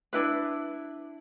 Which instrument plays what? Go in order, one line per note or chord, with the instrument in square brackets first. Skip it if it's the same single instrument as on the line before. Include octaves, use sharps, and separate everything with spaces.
[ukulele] D4 E4 B4